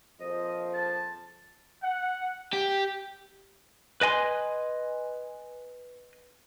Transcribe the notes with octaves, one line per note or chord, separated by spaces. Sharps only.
A#1 F2 F3 C5 D#5
A5
F#5
G4 G5
B4 D#5 G#5 C6